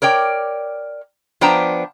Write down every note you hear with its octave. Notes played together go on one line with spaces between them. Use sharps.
A#4 C#5 D5 G5
F3 B3 D4 C5 G5 A#5